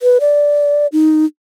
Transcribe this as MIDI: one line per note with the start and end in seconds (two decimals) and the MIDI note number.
0.02 0.18 71
0.20 0.87 74
0.92 1.25 63